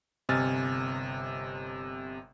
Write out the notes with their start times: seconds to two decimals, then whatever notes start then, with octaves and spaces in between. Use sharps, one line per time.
0.29 G1 C3 D#5 G#5 F6 A6